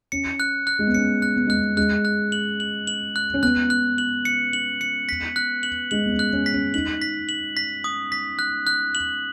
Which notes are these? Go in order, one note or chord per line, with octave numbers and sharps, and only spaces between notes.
C#4 C#7
F#6
F#6
G#3
B3
C#4 C#7
F#6
B3
G#3 F#6
B3
G#3 F#6
F#6
F#7
F#7
F#7
F#6
C#4
B3 F#6
F#6
F#7
C#7
F#7
C#7
B6
F#6
F#7
G#3 F#7
B3
C#4
F#6
C#4
B6
C#4
D#4 F#7
B6
F#7
B6
D#6
B6
F#6
F#6
F#7